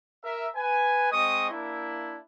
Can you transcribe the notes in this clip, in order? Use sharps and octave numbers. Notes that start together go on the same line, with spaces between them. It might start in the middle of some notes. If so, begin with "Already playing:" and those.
A#4 E5
B4 G#5
G#3 C4 D#5 C#6 D#6
A#3 D4 E4